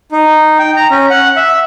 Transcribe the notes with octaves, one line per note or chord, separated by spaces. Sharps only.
D#4
G5
A#5
C#4
F#5
E5